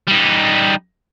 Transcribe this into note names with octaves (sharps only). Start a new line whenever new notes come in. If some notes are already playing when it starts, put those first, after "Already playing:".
G3 D#4